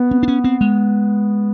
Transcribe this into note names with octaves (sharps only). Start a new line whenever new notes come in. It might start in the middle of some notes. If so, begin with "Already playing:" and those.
Already playing: B3
C4
D4
C#4
C4
G#3